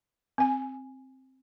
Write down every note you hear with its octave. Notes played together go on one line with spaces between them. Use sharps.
C4 G#5